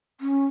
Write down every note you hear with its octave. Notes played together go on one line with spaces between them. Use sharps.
C#4